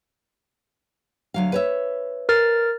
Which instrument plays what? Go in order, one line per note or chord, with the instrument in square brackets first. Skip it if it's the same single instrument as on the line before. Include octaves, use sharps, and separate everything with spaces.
[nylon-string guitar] D2 F#3 F5
B4 C#5 E5
[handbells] A#4 F6 A6